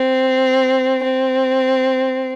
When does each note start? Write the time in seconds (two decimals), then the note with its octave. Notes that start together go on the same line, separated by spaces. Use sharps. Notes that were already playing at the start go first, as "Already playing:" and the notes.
Already playing: C4
1.04 C4